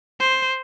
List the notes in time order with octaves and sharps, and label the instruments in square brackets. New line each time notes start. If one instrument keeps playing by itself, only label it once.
[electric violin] C5